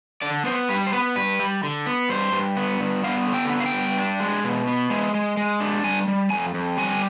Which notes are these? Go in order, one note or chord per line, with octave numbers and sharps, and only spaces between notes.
D3 D5
B3 C5
G3 B4
C5
B3 B4
G2 B4
G3
D3
B3
G2 C5
G2
B3
G2
B3 F5
D3
G5
B3
F5
G5
G2
D4
G#3
B2
B3
G#3
G#3
G#3
D4
G3 G#5
G3
F2 G#5
F2
G3 G#5